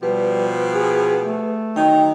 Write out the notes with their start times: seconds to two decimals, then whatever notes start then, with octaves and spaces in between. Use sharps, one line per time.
0.03 B2 F3 G3 G4 B4
0.75 G#4
1.23 A3
1.76 D#3 F#3 D#4 G5